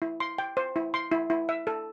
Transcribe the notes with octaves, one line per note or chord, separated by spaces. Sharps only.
E4
C6
G5
C5
E4
C6
E4
E4
E5
A4